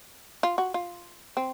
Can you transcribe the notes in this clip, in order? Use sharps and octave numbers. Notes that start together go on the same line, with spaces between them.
F4
F#4
F4
C4